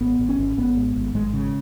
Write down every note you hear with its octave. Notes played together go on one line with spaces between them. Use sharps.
G#1 B3
G#1
C#4
G#1
G#1 B3
G#2
G#1
G#1 G#3
C#3